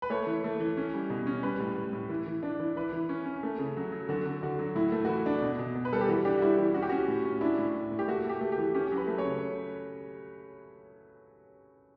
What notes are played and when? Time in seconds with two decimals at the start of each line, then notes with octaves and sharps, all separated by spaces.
0.02 B4
0.10 A3 C#5
0.27 E3
0.44 A3
0.60 E3
0.77 C#4
0.94 G3
1.10 B2
1.27 C#4
1.43 G3 B4
1.60 A2
1.76 A2
1.93 A2
2.10 E3
2.27 E3
2.43 D4
2.60 E3
2.76 E3 B4
2.93 E3
3.09 C#4
3.26 C#4
3.43 A3
3.59 C#3
3.77 F#3
3.92 F#3
4.09 D3 F#4
4.26 D3
4.43 D3 F#4
4.59 F#3
4.75 A2 E4
4.92 A3
5.05 F#4
5.09 E3 E4
5.26 D4
5.42 B2
5.59 B2
5.75 B2
5.85 B4
5.93 G3 A4
6.01 G4
6.09 E3 F#4
6.25 D4 G4
6.38 F#4
6.41 G3 E4
6.58 E3 G4
6.74 C#4 F#4
6.82 G4
6.89 C#4 F#4
7.08 A2
7.25 C#4
7.41 D4 E4
7.58 A2
7.75 A2
7.92 A2
7.99 G4
8.08 A3 F#4
8.25 A3 G4
8.41 A3
8.52 G4
8.58 E3
8.75 C#4 G4
8.92 F#3
8.97 B4
9.07 A3
9.18 C#5
9.24 C#3